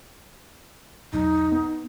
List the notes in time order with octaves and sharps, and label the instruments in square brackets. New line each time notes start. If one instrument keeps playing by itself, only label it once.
[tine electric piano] B1 E2 [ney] D#4
[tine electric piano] B3